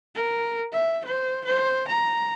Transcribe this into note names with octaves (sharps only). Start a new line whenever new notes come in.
A#4
E5
C5
C5
A#5